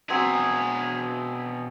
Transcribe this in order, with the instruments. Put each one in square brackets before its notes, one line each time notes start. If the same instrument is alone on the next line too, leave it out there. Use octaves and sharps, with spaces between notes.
[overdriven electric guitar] B2 G#4 [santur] F#3 C4 G#5